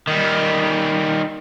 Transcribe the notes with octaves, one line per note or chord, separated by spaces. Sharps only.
D#3 G3